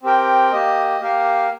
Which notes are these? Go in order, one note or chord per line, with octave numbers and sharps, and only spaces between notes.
C4 G4 A#4 G5
A#3 G4 D#5
A#3 G4 A#4 F5